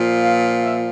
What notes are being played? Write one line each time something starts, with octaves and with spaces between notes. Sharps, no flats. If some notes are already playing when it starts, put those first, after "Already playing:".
Already playing: A#2 F3
F5
E5